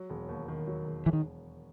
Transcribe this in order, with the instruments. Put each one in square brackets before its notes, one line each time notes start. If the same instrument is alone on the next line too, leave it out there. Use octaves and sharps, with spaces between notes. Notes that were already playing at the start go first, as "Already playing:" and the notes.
Already playing: [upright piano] F#3
E1
D#2
D#3
F#3
E1
[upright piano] E1 [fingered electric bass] E3
[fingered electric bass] D#3